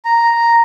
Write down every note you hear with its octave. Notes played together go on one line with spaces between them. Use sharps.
A#5